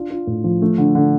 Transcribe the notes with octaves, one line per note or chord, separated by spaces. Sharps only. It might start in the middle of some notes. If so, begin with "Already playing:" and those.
Already playing: D4 F4
F4
A2
F3
A3
D3
D3